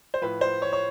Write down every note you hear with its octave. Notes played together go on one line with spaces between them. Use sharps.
C5
A2 F3 B4
C5
C#5
C#5